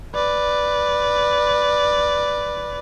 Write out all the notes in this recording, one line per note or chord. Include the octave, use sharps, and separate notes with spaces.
B4 D5